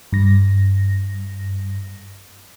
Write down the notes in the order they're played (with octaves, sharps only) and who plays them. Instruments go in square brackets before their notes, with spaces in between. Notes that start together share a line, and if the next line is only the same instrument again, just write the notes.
[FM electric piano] G2 A#6